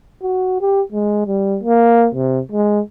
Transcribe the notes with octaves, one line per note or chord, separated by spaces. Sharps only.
F#4
G4
G#3
G3
A#3
C3
G#3